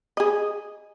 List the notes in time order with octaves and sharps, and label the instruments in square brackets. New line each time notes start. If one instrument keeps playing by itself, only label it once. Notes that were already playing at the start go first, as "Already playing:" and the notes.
[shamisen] G#4 D#5